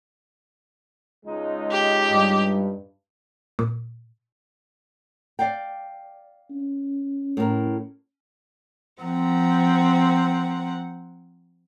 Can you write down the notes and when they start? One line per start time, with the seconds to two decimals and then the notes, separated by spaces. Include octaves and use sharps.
1.26 C#2 G#3 D#4
1.71 G4
2.11 G2
3.59 A#2
5.39 D5 F5 G5
6.51 C#4
7.37 A2 A#4
9.02 F3 C4 F#5 A#5